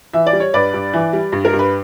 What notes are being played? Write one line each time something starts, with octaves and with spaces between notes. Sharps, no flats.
E3 E5
D5
G3
C#5
G2 B4 D5
G2
E3
G3
G2
A#4
G2
B4